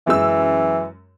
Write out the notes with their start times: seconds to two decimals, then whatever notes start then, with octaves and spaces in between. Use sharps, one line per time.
0.07 F#2 E3 G#3 E6